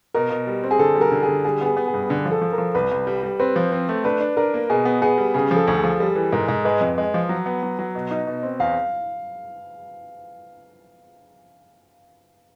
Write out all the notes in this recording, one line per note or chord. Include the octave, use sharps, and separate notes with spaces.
B2 A#4
B2
G3
C4
G#4
D3 A4
G3
A#4
D3
G#4
D3
G3 G#4
B3 G#4
B3
G#4
G2
D3
F3
A4
F3
A#4
F3
C2 B4
C2
G3
G3
C4 B4
F3
C4
A3
D4 B4
D4
D4 A#4
A#3
B2 G#4
B3
B3 G#4
G3
C#3 G#4
F3
A4
D2
G#4
F3
G3 A4
E3
G#2 A#4
G#2
G#3 B4
F2
G#3
F3
F#3
B3
F#3
F#3
B2
D#4
B2
C4
E2 F5